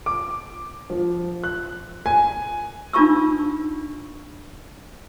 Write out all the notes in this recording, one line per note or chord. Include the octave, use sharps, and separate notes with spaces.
D6
F3
F#6
G#5
D4 D#4 F4 A5 C#6 E6